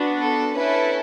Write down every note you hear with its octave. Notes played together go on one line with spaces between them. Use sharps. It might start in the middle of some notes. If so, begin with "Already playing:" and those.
Already playing: B3 D4 F#4
A4
C#4 E4 A4 B4